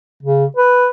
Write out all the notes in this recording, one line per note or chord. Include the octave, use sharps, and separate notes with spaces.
C#3
B4